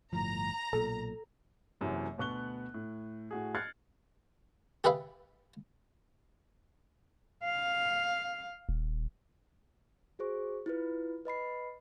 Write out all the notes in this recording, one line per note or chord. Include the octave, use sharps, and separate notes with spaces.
G1 A2 F3 A#5
B1 A#2 A4
F#1 F#2 C3 E3 F#3
D2 B2 B3 C#6 F#6 G7
A2
A2 F#4 G#4
F6 F#6 G#6 A6 C7 C#7
G4 G#4 B4 E5 F5
F5
D#1
F#4 G#4 C5 C#6
E4 F4 B4
B4 D#5 B5 C7